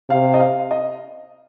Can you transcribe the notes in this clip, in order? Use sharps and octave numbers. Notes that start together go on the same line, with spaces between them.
C3 F5
D#5
F5
D#5